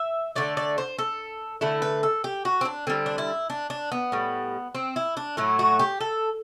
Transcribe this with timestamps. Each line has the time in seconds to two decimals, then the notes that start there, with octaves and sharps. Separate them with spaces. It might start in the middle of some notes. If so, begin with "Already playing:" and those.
Already playing: E5
0.36 D3 A3 D5
0.57 D5
0.78 C5
0.99 A4
1.61 D3 A3 E4
1.82 B4
2.03 A4
2.24 G4
2.45 F#4
2.61 C4
2.65 D4
2.87 D3 G3 C4
3.06 D4
3.18 E4
3.50 D4
3.70 D4
3.92 B3
4.12 A2 G3
4.75 C4
4.96 E4
5.17 D4
5.37 A2 F#3 A3 E4
5.59 F#4
5.79 G4
6.01 A4